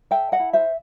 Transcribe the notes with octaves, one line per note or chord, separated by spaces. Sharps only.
A4 E5 G5
D#5 F#5
E4
C5 E5